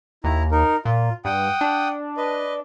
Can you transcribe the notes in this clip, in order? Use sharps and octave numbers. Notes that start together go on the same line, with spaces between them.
D#2 E4 A#5
D#4 A#4
A#2 F4
G2 F#5 G5 D#6
D4
B4 D#5